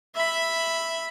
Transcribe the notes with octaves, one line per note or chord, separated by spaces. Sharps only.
E5 B5